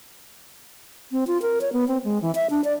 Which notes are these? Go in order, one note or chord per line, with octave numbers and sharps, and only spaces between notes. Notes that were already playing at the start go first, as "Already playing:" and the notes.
C4
F4
A#4
C#5
B3
C4
G#3
E3
E5
D4
D5